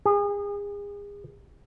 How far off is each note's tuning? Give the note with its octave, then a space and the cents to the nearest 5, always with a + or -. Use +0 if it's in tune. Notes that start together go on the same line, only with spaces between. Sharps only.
G#4 -35